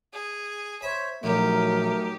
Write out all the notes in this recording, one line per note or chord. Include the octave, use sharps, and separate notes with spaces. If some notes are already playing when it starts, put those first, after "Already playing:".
G#4
C5 C#5 E5 B5
A#1 F#3 A3 D#4 G4 A#4